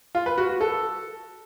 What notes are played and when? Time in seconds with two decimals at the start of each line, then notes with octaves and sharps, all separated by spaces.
0.15 F4
0.26 B4
0.38 F#4
0.49 F#4
0.61 A4